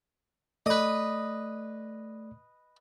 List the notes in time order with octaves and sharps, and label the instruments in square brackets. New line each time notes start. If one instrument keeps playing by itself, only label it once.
[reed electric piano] A3 D5 [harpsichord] B4 D#5